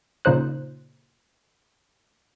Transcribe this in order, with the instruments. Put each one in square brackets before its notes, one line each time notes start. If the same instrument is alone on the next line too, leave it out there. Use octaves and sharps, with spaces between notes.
[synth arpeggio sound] A#2 C#3 D#4 C5 F#6